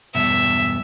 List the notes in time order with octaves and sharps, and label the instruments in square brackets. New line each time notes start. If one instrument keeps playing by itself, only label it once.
[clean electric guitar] E2 G2 B2 [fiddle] E5